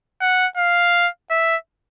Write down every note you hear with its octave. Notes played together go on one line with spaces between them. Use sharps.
F#5
F5
E5